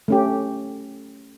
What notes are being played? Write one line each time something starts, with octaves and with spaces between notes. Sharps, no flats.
A3 C#4 G4